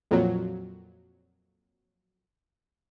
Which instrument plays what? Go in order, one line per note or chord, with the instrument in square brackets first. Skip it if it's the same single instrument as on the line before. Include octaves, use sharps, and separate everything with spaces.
[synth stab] F2 A#2 F#3